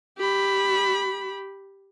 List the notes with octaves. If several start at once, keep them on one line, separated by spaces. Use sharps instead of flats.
G4 B5